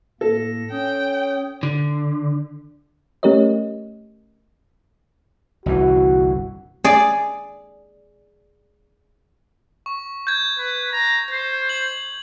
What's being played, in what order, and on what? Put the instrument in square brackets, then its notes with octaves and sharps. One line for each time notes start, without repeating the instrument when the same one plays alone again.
[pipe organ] A2 A#3 A#6 [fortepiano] A4
[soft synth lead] C#4 [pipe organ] C#5 D#6 [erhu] G5
[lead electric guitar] D3
[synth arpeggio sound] A3 C#4 G4 A#4 C#5 D#5
[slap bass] G1 C2 E3 [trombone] F#4
[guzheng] G#4 D5
[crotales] C#6
G6 G#6
[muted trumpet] B4
A#5
C5
[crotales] F#7